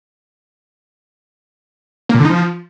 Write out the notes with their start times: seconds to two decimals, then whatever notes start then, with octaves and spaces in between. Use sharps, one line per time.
2.09 A#3
2.15 A#2
2.20 D3
2.25 D#4
2.30 F3